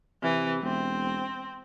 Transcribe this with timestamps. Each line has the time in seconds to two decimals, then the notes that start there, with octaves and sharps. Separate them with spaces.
0.23 C3 E3
0.63 E1 C4